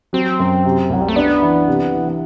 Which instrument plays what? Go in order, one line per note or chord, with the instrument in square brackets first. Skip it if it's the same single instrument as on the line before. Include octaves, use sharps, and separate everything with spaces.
[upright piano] F#3 [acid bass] C4
[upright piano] F#2
C3
[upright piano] C2 [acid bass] F#3
[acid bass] G3
A3
[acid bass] B3 [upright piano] D4
[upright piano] E3
C3
E3